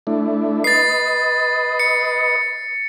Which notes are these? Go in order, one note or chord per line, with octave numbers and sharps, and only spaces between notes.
A3 D4 E4
B4 D#5 A6 C7
C#7